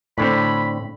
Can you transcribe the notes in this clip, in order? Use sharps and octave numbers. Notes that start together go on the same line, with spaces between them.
A2 D3 C4 B5